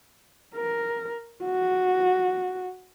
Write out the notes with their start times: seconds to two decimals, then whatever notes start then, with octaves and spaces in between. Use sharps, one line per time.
0.55 A#4
1.44 F#4